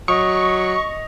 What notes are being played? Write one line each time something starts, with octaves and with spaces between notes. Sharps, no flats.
F#3 D#5 C#6 D#6